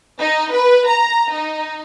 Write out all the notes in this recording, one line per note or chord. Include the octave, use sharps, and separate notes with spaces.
D#4
B4
A#5
D#4